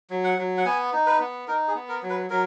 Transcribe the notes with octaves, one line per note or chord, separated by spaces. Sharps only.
F#3
F#5
F#3
F#5
B3 G#5
D#4
B4
B3
D#4 A#4
G#4
B3
A#4
F#3
B4
F#3 A#4